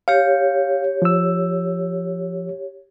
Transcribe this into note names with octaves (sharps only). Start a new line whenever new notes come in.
G4 C#5 F5
F3 E6